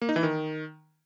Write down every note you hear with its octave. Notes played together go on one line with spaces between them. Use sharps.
A#3
D#4
E3
D#3